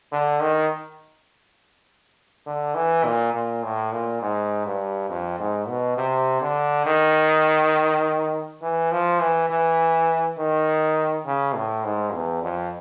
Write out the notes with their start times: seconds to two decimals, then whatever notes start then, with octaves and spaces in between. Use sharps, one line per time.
0.12 D3
0.41 D#3
2.47 D3
2.75 E3
3.04 A#2
3.34 A#2
3.63 A2
3.92 A#2
4.22 G#2
4.66 G2
5.10 F2
5.40 G#2
5.68 B2
5.97 C3
6.42 D3
6.86 D#3
8.62 E3
8.92 F3
9.20 E3
9.50 E3
10.38 D#3
11.25 C#3
11.55 A2
11.84 G#2
12.14 E2
12.43 F2